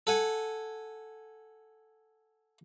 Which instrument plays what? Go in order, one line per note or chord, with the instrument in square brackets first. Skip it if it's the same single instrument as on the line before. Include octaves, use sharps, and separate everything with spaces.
[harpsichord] A4 F#5 G#5